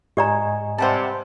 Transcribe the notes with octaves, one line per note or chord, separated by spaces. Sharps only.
G#2 G4 D5 D#5 G#5 A#5
C3 G3 C5 F#5 A5